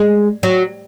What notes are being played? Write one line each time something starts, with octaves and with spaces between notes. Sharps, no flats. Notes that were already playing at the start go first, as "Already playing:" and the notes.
Already playing: G#3
F#3